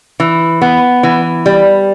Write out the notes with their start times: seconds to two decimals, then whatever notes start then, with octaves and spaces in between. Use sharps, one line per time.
0.20 E3
0.62 B3
1.03 E3
1.46 G3